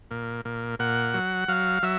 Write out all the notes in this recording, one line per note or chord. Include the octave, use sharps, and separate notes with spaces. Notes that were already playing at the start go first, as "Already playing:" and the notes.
A#2
A#2
A#2 F#5
F#3
F#3 F5
F#3 E5